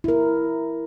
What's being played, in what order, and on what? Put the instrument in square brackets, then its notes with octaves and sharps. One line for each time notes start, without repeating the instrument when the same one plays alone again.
[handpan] E4 A#4